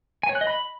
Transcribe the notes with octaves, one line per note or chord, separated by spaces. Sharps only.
G#5
C#5
F#6
D#5
B5